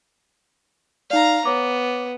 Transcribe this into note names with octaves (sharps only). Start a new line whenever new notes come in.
D#4 D5 F5 A#5
B3 C#5 D6